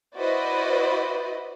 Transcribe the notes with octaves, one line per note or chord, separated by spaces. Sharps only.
E4 F#4 B4 C5 D5 D#5